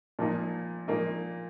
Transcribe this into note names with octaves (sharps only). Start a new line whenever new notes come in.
A#2 F3 A#3 D#4
A#2 F3 A#3 D#4